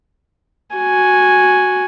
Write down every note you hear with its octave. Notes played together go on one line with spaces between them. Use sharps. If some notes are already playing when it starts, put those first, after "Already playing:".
F#4 G#5